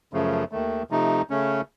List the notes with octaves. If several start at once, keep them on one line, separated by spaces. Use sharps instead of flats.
F#2 C#3 F3 A3
D#2 D#3 A3
C3 F3 A3 D#4
C#3 A3 C#4